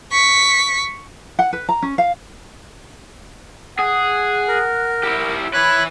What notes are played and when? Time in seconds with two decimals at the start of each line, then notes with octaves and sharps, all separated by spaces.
0.12 C#6 B6
1.39 F#5
1.53 B4
1.69 A#5
1.83 C#4
1.98 F5
3.79 G#4 F#5
4.48 A#4
5.03 E4 G4
5.53 E4 B4 C#5 B5 F#6